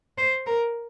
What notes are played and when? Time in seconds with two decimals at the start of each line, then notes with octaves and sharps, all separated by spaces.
0.18 C5
0.47 A#4